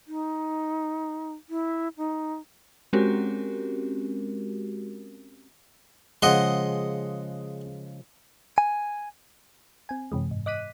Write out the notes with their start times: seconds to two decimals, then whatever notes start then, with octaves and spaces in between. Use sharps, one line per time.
0.07 D#4
1.50 E4
1.98 D#4
2.93 G#3 C4 C#4 F#4 G4 A#4
6.22 C#3 F3 G#3 D#5 F#5 C6
8.58 G#5
9.89 C4 G#5
10.12 F#2 C3 E3 G#3
10.31 G#2
10.46 D#5 D6 F#6 B6 D#7